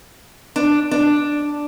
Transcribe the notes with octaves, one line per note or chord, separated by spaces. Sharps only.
D4
D4